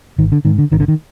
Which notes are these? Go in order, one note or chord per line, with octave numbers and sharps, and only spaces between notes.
G#1 D#3
D3
G#2 D#3
D3
G#1 D#3
D3
D#3